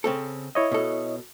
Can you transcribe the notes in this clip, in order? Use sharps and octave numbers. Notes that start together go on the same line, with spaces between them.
C#3 C4 A4
E4 C#5 D#5
B2 A4